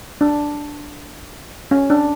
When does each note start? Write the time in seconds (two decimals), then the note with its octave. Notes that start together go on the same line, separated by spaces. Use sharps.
0.21 D4
1.71 C#4
1.90 D4